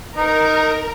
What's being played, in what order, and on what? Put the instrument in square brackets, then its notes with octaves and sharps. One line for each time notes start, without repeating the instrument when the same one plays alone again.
[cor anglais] D#4 [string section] A#4